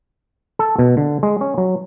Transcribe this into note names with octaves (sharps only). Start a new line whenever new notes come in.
A4
B2
D3
G#3
C#4
F#3